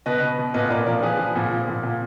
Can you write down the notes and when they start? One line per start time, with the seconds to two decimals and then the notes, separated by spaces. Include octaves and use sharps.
0.06 B2 B4 D#5
0.21 B2
0.39 B2
0.54 A#2 B4 D#5
0.70 A#2 A#4 D5
0.86 F3 A#4 D5
1.03 F3 G#4 B4
1.19 F3
1.35 A#2
1.51 F3
1.68 A#2
1.83 A#2